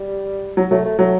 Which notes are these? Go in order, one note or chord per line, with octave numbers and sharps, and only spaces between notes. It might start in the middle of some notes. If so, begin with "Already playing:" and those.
Already playing: G3
F#3
F#3 A3
A3
F#3 A3